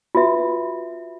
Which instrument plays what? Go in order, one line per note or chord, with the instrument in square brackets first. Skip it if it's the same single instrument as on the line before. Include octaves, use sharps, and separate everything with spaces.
[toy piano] F4 F#4 B4 E5